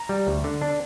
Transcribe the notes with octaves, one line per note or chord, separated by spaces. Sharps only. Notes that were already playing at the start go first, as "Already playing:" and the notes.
Already playing: A#5
G3
D2
D3
D4